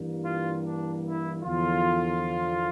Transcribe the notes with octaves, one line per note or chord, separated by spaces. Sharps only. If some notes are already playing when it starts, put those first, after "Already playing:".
Already playing: G2 E3 G3 A#3
F4
D4
E4
E2 D3 F3 F4